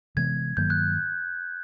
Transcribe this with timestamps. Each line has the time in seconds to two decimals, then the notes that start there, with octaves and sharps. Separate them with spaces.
0.17 C3 E3 G#3 B3 G#6
0.57 G2 D#3 F#3 A#3 G6
0.70 F#6